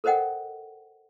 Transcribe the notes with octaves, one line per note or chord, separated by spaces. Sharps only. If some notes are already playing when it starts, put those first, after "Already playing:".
A4 A#4 C5 D#5 F#5 G5